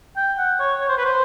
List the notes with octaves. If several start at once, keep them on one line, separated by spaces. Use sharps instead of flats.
G5
F#5
C#5
C#5
C5
B4
C5